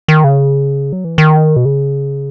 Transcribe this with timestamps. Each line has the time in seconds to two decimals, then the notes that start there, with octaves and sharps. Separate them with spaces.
0.08 D#3
0.24 C#3
0.93 F#3
1.04 E3
1.18 D#3
1.56 B2
1.65 C#3